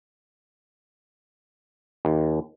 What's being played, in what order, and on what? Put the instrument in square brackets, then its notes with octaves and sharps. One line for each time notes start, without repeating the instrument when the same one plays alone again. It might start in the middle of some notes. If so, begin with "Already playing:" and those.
[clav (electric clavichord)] D#2